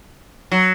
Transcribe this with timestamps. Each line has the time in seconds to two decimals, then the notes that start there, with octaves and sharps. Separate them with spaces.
0.52 F#3